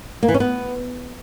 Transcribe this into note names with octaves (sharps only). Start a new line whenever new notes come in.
A#3
E3
C#4
B3